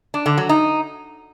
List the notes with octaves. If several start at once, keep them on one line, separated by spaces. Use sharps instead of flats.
D4
D3
F#3
D#4